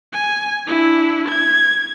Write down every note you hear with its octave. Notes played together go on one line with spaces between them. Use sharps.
G#5
D4 E4
G#6